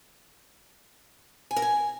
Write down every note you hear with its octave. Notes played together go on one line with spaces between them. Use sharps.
G#5
A#4
G#5